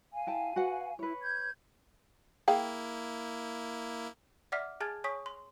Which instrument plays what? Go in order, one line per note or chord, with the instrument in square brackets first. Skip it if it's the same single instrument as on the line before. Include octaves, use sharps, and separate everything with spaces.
[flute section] F5 G#5
[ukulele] E4 G5 A5
F#4 B4 F#5
[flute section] E4 [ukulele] B4 C#5
[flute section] G6 G#6
[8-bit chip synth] A#3 E4 [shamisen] G#4 F5 G5
[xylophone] D5 E5 F#5 D6 F6 B6
G#4 G#5 A5 F6 G#6 A6
C#5 G#5 C#6 D#6 B6
C6